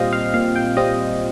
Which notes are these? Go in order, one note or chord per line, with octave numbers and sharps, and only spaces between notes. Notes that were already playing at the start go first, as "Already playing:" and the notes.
Already playing: A#2 G3 C4 F4 D#5 F5 G5
F5
A#2 F5
G5
G3 C4 F4 D#5